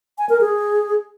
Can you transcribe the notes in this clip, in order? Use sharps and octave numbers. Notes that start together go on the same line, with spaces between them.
G#5
A#4
G#4